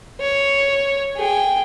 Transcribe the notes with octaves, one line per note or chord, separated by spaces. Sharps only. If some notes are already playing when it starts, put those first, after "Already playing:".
C#5
G#4 G5